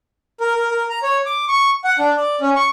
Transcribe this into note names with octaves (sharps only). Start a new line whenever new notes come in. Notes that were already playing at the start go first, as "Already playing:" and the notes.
A#4
A#4
A#4
A#5
C#5
D6
C#6
F#5
D4
D5
C#4
C#6